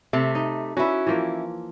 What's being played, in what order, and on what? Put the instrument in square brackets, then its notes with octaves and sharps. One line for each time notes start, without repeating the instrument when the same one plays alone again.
[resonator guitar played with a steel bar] C3 A3
[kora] D#4
[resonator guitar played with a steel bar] C#4 E4 [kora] F#4 B4
[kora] E3 F3 A#3